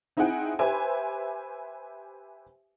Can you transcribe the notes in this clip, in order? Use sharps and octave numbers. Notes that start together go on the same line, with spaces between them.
C4 D#4 E4 G#4 F#5 G5
G4 B4 C5 E5 G#5